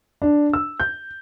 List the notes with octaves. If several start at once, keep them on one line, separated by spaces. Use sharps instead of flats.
D4
E6
G6